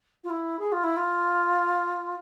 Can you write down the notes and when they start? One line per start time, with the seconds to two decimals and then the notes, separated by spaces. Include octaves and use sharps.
0.24 F4
0.30 E4
0.59 G#4
0.72 F4
0.83 E4
0.96 F4